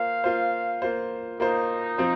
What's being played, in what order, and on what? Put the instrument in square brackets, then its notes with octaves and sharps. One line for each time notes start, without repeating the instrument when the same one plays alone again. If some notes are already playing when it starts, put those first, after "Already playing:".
Already playing: [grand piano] A#3 F4 C5 [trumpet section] F5
[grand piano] A#3 F4 C5
A#3 F4 C5
[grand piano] A#3 F4 C5 [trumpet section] D#4
[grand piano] F3 C4 F4 C5